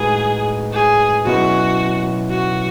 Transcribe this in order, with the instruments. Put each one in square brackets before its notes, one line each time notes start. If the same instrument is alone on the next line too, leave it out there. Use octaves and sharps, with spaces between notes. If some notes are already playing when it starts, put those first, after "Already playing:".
Already playing: [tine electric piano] A2 G#3 D#4 F#4 B4 [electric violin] G#4
[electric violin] G#4
[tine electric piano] B2 F#3 C#4 E4 B4 [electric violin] F#4
[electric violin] F#4